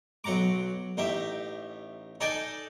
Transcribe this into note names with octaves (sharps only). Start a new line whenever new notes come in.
B1 F#3 F#5 A#5 D6
A1 D#4 G4 E5
D#4 A4 D5 D#5 G5 G#5